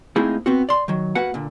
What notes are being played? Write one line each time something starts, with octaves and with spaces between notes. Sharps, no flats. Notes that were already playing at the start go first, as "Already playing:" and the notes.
A3 A#3 C4 D#4 E4 G#4
B3 C4 F#4
D5 C6
D#3 F#3
A#3 F#4 B4 F#5
A#2 D3